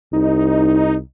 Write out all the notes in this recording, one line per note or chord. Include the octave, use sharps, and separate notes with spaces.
C2 D#4